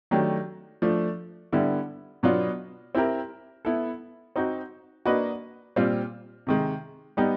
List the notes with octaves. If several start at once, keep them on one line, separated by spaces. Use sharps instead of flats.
D#3 F#3 A3 D4 G4
F3 A3 D4
D3 G3 B3 E4
B2 F#3 B3 D4 F4
C4 E4 G4 A#4
B3 E4 A4
C4 D#4 F#4
A#3 D4 F#4 B4 D#5
A#2 G3 C4 F4
C3 D#3 G#3
G3 B3 D#4 G4